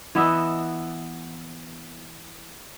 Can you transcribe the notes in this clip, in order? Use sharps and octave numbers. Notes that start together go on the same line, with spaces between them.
E3 B3 D#5 E5